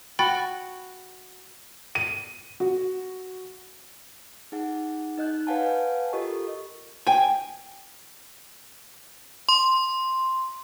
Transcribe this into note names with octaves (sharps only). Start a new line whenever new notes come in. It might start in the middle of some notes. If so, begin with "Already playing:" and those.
F#4 G5 B5 A6
D#7
F#4
D#4 G#4 F#5
D#4 D#5 F#6 G6
B4 C#5 F5 F#5 G#5 A5
F4 G4 A4 A#4 D#5 C#6
G5 G#5
C6